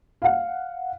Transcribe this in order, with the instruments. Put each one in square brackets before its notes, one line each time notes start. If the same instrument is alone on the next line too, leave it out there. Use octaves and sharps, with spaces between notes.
[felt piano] F5 F#5